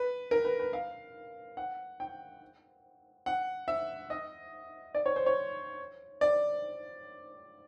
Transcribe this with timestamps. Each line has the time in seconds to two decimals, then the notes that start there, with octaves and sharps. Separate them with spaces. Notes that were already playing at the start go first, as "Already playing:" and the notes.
Already playing: B4
0.31 A#4
0.45 B4
0.59 B4
0.73 F5
1.57 F#5
2.00 G5
3.26 F#5
3.68 E5
4.10 D#5
4.95 D5
5.06 C#5
5.16 C5
5.26 C#5
6.21 D5